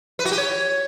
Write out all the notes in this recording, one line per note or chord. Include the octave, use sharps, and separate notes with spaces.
B4
F#4
G4
C#5